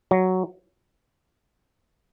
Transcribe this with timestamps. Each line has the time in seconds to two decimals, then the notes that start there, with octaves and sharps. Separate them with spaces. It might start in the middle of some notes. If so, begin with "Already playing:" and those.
0.11 F#3